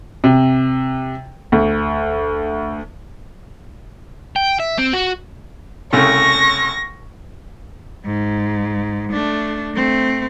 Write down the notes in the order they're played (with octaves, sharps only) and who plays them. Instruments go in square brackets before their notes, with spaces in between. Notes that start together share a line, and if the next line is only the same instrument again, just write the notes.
[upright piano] C3
D2
[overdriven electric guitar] G5
E5
C4
F#4
[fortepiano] C2 C#3 A3 [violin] C#6 A#6
[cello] G#2
A3 D4
A3 C4